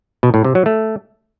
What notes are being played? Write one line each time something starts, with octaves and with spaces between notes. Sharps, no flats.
B2
A2
C3
F#3
A3